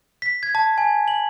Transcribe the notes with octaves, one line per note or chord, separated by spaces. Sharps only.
B6
G#6
A5
G#5
F#7